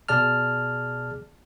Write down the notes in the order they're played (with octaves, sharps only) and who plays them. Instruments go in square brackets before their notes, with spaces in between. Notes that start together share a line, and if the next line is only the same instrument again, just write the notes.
[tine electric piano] B2 G#4 D5 A5 F6